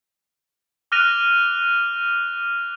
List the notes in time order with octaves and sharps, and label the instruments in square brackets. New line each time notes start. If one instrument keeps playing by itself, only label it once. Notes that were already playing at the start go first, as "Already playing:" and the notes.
[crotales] D6 F6 F#6 A#6 D#7 F7